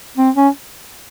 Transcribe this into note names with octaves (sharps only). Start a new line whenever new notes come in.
C4
C#4